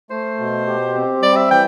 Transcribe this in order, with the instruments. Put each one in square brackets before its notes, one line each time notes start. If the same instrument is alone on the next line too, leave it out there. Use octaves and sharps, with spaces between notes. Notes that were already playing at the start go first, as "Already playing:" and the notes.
[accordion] A3 [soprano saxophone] C5
[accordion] B2
G4
C4
[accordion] G3 [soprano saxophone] D5
[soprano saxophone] E5
[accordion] E3 [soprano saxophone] G5